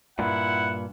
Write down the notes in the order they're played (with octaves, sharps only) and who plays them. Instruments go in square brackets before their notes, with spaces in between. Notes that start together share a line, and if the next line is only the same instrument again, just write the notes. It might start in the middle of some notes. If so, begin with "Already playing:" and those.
[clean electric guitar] G2 A#2 [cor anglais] E4 [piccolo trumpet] F#5